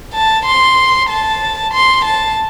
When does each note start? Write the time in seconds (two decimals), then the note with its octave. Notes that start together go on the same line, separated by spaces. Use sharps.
0.14 A5
0.45 C6
1.09 A5
1.74 C6
2.05 A5